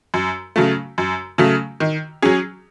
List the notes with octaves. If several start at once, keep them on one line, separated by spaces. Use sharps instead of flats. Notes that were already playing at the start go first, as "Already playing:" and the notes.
F#2
C#3 F#3 A3
F#2
C#3 F#3 A3
D#3
F#3 C#4 G#4